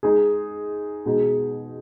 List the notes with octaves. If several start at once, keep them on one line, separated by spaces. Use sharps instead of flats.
G#3 D#4 G#4
B2 G#3 D#4 G#4